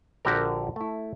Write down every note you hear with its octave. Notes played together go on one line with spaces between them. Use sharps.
A#1 D3 F#4 G4 A#4
A3 E4